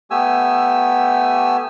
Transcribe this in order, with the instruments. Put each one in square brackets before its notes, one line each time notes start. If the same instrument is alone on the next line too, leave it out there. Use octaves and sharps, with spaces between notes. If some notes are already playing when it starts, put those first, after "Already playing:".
[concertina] A3 B3 G4 G#5 E6